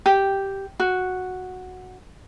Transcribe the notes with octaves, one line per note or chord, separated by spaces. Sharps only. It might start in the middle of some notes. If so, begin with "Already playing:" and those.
G4
F#4